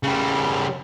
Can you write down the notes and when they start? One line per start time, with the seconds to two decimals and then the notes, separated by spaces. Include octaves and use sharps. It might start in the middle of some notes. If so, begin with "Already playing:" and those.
0.03 C#3 G3